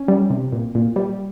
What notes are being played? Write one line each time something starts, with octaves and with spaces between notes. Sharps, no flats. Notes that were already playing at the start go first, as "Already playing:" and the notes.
Already playing: C#4
G3
C3
A#2
A#2
G3